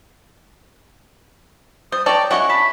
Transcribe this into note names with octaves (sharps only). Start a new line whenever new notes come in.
G3 C5 D#6
A4 C#5 D5 G5 A#5
C#4 E4 F#4 D#5 F#5 C#6
A5 B5